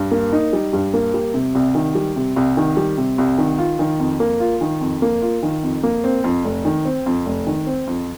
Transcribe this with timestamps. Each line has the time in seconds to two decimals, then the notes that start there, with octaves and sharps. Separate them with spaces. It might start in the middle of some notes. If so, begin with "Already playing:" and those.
Already playing: G2
0.11 A#3
0.33 D#4
0.53 G3
0.73 G2
0.94 A#3
1.14 G3
1.34 C3
1.55 C2
1.75 D#3
1.95 G3
2.16 C3
2.36 C2
2.57 D#3
2.77 G3
2.97 C3
3.18 C2
3.38 D#3
3.58 F4
3.79 D#3
4.00 F2
4.20 A#3
4.40 F4
4.61 D#3
4.81 F2
5.02 A#3
5.22 F4
5.43 D#3
5.63 F2
5.83 A#3
6.04 C4
6.24 F2
6.44 F1
6.65 D#3
6.85 C4
7.06 F2
7.26 F1
7.47 D#3
7.67 C4
7.87 F2